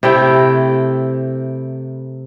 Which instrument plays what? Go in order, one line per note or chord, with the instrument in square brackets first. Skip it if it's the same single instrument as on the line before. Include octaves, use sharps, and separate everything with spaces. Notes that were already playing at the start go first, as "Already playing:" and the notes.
[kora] C3 A3 E4 G5